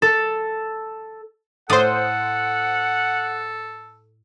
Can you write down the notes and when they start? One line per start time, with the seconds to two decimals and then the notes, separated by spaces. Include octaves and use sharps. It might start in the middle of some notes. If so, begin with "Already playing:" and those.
0.02 A4
1.70 A2 A4 C5 D5 F#5 D#6